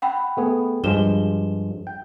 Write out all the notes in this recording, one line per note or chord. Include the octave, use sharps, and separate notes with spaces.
F#5 G5 B5
A3 B3 G#4
G2 F3 G#3 E7 G7
G5